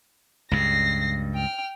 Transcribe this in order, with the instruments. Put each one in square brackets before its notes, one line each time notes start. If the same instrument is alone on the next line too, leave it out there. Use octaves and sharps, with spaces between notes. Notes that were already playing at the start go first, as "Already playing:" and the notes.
[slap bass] C#2 G2 [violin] A#6 C7
[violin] G5 F6